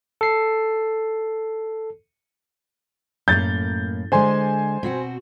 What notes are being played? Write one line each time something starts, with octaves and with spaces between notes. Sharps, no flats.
A4 C7
F#2 A2 A#3 G6 A6
D3 G#3 C5 G#5 C6
B2 C4 F#4